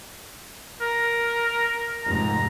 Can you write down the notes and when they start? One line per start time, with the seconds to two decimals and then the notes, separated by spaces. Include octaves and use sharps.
0.81 A#4
2.04 F1 G#2 A#5